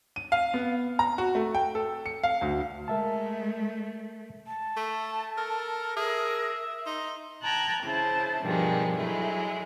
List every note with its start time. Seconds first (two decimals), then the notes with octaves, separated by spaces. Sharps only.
0.16 D#7
0.32 F5
0.54 B3
0.99 A#5
1.18 F#4
1.35 A3
1.55 G5
1.75 A4
2.06 C#7
2.23 F5
2.41 D2
2.88 G#3 A3 A#4 E5 A5
4.47 A5
4.76 A3
5.38 A4 A#4
5.97 G#4 A#4 E5
6.86 D#4 C6
7.43 G5 A5 A#5 F#6 G#6
7.83 C#3 E4 C5 A5
8.44 G2 B2 D#3 F3 G#3
8.97 F#3 G#3 A3 E4